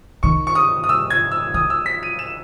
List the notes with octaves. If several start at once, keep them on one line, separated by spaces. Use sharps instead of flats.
D#3 C#6
C#6
D#6
D#6
E6
G#6
E6
D#3 D#6
E6
B6
D#7
E7